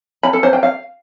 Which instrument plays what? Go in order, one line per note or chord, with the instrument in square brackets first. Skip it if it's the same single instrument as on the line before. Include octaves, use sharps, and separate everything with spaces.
[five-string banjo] B5
A4
C5
G5
F5